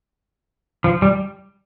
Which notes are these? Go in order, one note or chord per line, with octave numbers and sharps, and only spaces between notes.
F3
G3